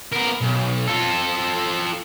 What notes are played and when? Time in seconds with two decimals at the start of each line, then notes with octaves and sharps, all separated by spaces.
0.12 B3 A#4
0.41 B1
0.87 F4 A4